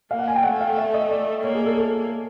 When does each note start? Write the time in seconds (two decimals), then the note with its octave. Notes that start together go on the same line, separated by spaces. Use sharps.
0.11 A#3 F5
0.19 F#5
0.28 G#5
0.36 G5
0.44 A3 F#5
0.61 F5
0.77 E5
0.94 D#5
1.11 D5
1.43 A#3 C#5
1.55 G#4
1.66 A4
1.77 A4